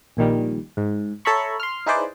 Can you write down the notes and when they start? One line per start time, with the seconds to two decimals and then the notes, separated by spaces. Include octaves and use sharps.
0.17 A#1 A#2 D#3 G3
0.77 G#2
1.25 A4 C#5 E5 A#5 B5 C#6
1.60 C6 F6
1.86 D#4 E4 G#4 B4 C5 D5